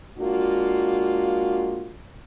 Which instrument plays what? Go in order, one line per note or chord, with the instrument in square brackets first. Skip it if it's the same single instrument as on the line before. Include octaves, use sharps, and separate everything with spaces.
[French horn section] G#3 A#3 D4 F4 F#4